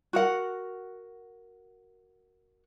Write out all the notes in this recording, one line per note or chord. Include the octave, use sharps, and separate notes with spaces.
F#4 A#4 F#5